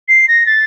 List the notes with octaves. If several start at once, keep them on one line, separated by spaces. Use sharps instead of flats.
C7
A#6
A6